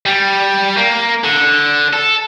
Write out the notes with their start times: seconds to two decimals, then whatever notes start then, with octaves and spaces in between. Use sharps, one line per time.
0.06 G3
0.77 A#3
1.24 D3
1.93 A4